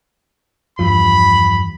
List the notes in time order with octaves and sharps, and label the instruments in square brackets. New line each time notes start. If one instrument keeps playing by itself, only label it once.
[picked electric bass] E2 G2 F3 [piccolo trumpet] B5